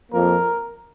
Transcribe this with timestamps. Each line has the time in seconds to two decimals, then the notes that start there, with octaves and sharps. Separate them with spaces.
0.11 F2 F3 A#3 A#4